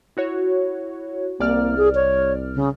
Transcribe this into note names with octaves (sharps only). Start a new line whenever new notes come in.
E4 F#4 C#5
C2 A#3 D5 F6
G#4
C#5
C#3